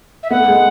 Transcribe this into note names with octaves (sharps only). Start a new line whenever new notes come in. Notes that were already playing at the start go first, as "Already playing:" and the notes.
E5
B3 F#5
A3
G#3